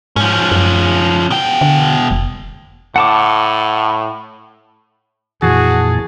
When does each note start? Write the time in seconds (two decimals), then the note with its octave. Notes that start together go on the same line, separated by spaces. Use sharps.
0.16 G#2 F3 C#4
0.51 F#2
1.30 B2 G5
1.61 D3
2.11 F1
2.96 A2 F#5 A5 D6
5.42 F2 A#2 E3 F#4 G#4 A5